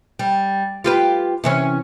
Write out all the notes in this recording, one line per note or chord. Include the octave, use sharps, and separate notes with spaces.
G3
F4 G4 B4
C3 E3 C#4